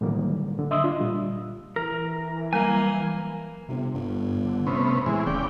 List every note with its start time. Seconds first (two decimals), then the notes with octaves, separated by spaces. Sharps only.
0.01 A2 D3 D#3 F#3 G3 A#3
0.59 D3
0.71 D#5 E5 C6 D#6 E6
0.84 D4 F4
1.00 A#2 G3
1.76 E3 A#4
2.53 F#3 G3 A#3 G#5
3.69 G1 C3
3.94 G1 G2
4.45 D3
4.67 C3 A3 B3 C#4
5.06 A2 E3 G#3
5.27 D#1 C#3 D5 G5